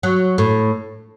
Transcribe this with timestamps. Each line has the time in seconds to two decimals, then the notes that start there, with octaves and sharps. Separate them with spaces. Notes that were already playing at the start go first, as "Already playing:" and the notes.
0.03 F#3
0.38 A2